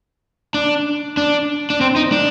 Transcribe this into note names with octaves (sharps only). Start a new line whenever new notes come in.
D4
D4
D4
C4
D#4
D4